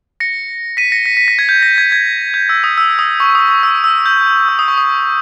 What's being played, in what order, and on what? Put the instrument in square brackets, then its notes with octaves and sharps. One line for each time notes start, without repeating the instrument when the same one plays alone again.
[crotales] A#6 C#7
B6 D#7
A#6 C#7
B6
B6
A#6
G#6
G6
A#6
G#6
G#6
G6
E6
D#6
E6
D#6
C#6
D#6
C#6
E6
E6
G6
E6
D#6
C#6
D#6